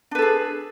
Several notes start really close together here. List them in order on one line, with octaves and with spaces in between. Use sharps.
D4 B4 A4 G#4